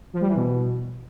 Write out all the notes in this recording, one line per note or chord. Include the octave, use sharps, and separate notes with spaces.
F3
G3
E3
B2